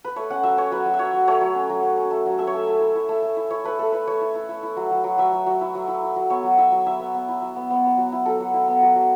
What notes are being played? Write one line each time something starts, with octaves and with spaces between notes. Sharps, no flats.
B4
A3 C#5
C#4 F#5
F#3 E5
C#4 C#5
F#3 B4
F#3
E5
F#3 C#5
F#3
A3 C#5
F#3
C#4
F#3
C#4
C#4
A3
F#3
A3 E5
C#5
A3 E5
A3
E4
E4
A3
A3
E4
E4 C#5
A3 B4
A3 A4
E4 B4
A3 C#5
E4
E4
E4
E4
F#3
F#3
F#3
F#3 E5
F#3
F#3
E4
F#3
E4
E4
F#3
B3 C#5
F#3
E4 E5
F#3
E4 E5
B3
B3
E4
F#3
B3
B3
B3
F#3
E4
F#3 A4
F#3
E4
B3
F#3
F#3